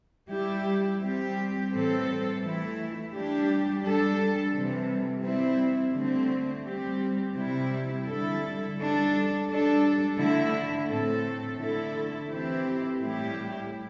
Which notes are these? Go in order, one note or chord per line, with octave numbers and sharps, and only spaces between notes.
G3 E4 G4
G3 C4 G4
A2 E3 G3 C4 A4
E3 A3 E4
G3 D4 G4
G3 D4 A4
C3 E3 G3
G3 C4 E4
D3 A3 C4
G3 C4 G4
C3 G3 E4
D3 G3 E4 A4
G3 D4 A4
G3 D4 A4
D3 A3 E4
A2 A3 C4 A4
D3 A3 E4 A4
E3 C4 E4 G4
A2 G3 E4 G4